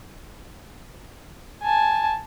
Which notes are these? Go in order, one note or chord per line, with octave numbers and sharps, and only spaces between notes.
G#5 A5